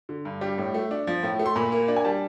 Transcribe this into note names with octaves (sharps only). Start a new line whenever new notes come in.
D3
G2
G3
A2
A3
D4
F3
A2
A3
C6
A#2 B5
A#3
D4
G#5
G3 A5